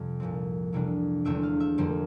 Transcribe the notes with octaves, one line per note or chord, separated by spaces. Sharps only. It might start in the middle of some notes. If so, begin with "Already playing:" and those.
Already playing: F2 C3 G3
C2 A#2 F3 C4
F2 C3 E3 G3 D4
E1 E2 D3 A3 D4 E5
F5
E5
F2 D3 G3 A#3 C5